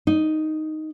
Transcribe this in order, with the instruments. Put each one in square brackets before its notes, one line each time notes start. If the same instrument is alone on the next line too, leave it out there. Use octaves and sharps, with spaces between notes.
[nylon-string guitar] D#4